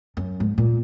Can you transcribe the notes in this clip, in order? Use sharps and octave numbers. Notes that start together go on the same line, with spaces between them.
F#2
G#2
A#2